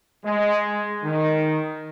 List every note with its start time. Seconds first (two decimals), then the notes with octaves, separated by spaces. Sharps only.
0.24 G#3
1.03 D#3